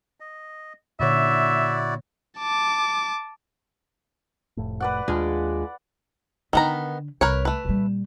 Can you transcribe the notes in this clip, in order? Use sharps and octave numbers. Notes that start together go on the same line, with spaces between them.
D#5
A#2 D3 E4 F#4 C#5 D5 E5
A5 D6
F1 A2
B4 D5 F#5
D#2 G#3 D4 F4 G#4
D3 D#3 B3 A#5
C2 A#4 B4 C#5
A3 B4
A#2 G3